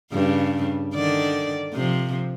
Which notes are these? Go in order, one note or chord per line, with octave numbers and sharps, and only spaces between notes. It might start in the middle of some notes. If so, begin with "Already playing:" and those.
G2 C#3
D3 D#3 D5
C3 F3